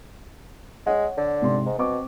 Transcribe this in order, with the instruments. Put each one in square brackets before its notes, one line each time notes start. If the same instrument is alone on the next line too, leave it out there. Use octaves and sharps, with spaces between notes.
[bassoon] G#3 [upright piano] C#5 F#5
[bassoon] D3
[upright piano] G#2 C3 C6
[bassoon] G#2
[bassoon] B2 [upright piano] C4 C#6 D6